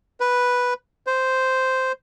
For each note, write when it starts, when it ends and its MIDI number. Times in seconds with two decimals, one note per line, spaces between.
0.20 0.74 71
1.07 1.92 72